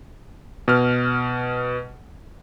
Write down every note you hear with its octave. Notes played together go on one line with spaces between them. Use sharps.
B2 F6